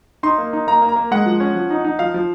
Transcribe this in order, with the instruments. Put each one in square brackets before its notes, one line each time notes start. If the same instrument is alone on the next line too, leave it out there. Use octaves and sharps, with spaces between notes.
[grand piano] D#4 C6
A#3
D#4
A#3 A#5
A#3
A#5
A#3
G#3 F#5
F3
C#4
F3
D#4
D#4
F3 F5
F3